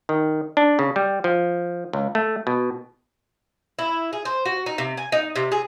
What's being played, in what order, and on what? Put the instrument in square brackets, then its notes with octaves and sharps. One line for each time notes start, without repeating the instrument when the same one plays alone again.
[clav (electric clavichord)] D#3
D4
C#3
G3
F3
C#2
A3
B2
[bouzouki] E4
G#4
C5
F#4
D#4
C3
G#5
D#4
C3
G#4